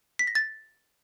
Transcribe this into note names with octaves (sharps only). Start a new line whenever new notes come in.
B6
A#6
A6